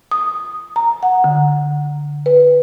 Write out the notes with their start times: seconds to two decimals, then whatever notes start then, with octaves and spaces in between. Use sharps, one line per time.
0.11 D#6
0.76 A#5
1.03 F#5
1.24 D3
2.26 B4